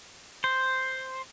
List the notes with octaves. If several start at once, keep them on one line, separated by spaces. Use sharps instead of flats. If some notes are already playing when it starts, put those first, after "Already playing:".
C5